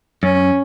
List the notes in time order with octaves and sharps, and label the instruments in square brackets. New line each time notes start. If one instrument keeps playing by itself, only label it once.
[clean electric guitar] F#2 [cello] C#4